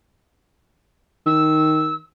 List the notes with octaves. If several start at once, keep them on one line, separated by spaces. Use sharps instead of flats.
D#3 E6